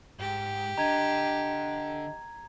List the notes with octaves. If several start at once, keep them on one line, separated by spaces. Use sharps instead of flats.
G#2 G4
D3 D#5 A#5 G#6